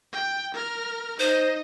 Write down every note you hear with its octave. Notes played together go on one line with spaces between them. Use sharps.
G5
A#4 F6
D#4 C5 D#5